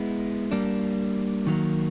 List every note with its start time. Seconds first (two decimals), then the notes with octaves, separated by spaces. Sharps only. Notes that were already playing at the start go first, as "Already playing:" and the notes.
Already playing: G#3 B3 E4
0.51 G3 A#3 D4
1.47 D#3 F#3 A#3